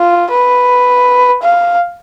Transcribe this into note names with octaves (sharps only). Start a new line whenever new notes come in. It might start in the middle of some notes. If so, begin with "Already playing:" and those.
Already playing: F4
B4
F5